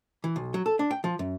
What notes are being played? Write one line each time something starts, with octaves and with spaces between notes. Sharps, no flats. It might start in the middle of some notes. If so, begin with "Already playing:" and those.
E3
B1
F#3
A4
D4
G5
F3
F#2